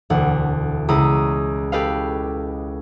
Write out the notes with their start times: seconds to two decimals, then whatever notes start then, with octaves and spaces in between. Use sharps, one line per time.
0.10 E1 D2 F#5
0.88 C#2 E4 A#5 D#6
1.72 G4 A4 B4 D#5 F5